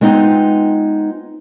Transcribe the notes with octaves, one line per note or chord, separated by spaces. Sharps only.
G#3 B3 C4 D#4 F4